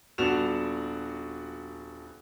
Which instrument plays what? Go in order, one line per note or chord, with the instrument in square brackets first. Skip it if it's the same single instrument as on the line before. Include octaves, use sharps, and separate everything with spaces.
[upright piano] D#1 B3 D4 F#4 E7 F7